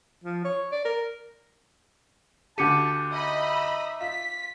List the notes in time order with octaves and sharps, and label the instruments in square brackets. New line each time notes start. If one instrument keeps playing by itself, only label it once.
[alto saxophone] F3
C#5
D5
A#4
[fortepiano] D2 D3 G4 [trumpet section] A5 [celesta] D6 C#7 D#7
[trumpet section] D#4 E5 [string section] D#5 B5
[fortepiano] F4 [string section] B6